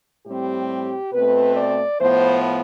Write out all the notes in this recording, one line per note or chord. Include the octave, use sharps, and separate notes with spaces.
A2 G3 C4 G4
B2 A3 C4 B4
D5
A2 F3 B3 C5